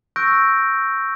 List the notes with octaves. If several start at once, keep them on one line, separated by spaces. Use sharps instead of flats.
C#6 E6 F#6 G6 A#6 D7